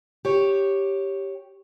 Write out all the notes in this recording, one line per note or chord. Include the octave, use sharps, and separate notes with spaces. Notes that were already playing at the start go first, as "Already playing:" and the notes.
G4 C#5